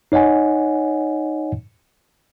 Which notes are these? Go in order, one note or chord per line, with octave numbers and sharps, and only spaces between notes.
D#4 C#5 D#5 F#5 G#5